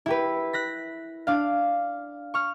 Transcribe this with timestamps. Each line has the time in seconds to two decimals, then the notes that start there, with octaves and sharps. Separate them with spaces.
0.06 E4 G4 B4
0.53 F#6 A#6 B6
1.27 D4 F5
2.34 C#6 F6